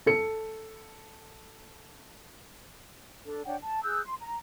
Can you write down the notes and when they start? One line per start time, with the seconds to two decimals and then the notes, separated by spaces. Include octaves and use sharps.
0.06 A4 C#7
3.25 D4 A4
3.45 D4 C#5 F#5 G5
3.63 A5
3.84 G#4 E6 F#6 G6
4.06 C6
4.20 A#5